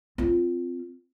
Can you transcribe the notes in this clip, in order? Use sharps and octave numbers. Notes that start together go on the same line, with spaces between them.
C4 F4